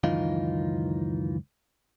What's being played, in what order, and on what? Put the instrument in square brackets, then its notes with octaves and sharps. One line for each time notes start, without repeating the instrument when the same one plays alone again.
[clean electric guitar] C#2 F#2 D#3 E3 D#4 F4